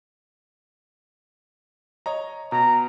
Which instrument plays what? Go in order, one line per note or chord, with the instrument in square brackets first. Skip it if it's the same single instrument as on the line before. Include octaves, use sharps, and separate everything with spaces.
[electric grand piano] C#5 D#5 A#5
[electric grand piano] B2 [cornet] A#5